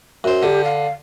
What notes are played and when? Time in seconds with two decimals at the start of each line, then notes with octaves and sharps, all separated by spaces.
0.24 F#2 C5
0.43 D3 G4
0.64 F5